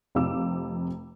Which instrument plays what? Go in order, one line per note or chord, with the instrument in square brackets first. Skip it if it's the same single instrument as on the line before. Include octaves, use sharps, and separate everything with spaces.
[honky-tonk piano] F1 F2 C3 F5 D6 E6